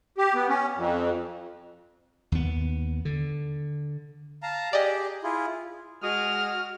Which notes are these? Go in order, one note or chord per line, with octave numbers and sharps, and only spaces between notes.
G4
B3
C#4
F2
D#2 B3
D3
F5 A5 A#5
G4 G#4 D5 D#5
E4 F4 G#4
G#3 F#4 D#6 F6